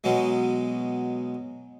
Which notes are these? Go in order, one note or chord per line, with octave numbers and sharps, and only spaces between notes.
B2 F#3 G#3